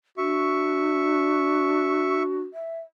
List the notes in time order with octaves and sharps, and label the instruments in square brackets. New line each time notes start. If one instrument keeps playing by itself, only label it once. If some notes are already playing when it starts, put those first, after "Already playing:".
[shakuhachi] D4 [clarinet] F#4 [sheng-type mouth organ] E5 C#6
[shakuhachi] E5